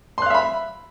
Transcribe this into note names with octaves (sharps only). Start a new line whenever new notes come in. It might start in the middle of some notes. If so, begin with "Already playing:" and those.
E5 F5 B5 C6 F#6